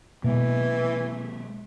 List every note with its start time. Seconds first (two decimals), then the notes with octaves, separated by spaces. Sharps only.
0.24 B2 E3 G#3 A#3